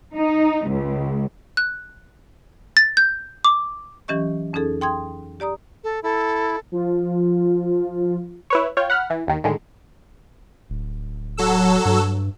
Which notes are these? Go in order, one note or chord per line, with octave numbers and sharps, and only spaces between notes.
D#4
C#2
F#6
A6
G6
D6
E3 F#3 C#4 G4 D#5 C#6
F2 C#4 D#4 G#4 A4
G5 C6 D#6 G#6
G4 D5 A#5 D#6
A4
E4 A4
F3 F4
E4 B4 C#5
F4 C#5 G5
F#5 B5 F6
E3
D#2 D#3
A2 D3 D#3 G#3
D1
F#3 A4 E6
G2